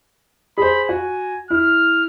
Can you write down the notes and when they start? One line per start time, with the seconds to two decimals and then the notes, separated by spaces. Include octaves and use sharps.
0.58 G#4 C5 B5
0.89 F#4 G#5
1.50 E4 F6